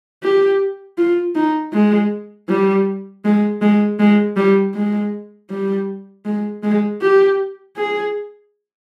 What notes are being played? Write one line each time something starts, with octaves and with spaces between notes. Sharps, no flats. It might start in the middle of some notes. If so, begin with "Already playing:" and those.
G4
F4
D#4
G#3
G3
G#3
G#3
G#3
G3
G#3
G3
G#3
G#3
G4
G#4